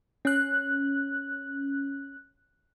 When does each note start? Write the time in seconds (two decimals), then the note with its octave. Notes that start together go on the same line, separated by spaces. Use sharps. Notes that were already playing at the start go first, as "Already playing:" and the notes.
0.25 C#4 F#6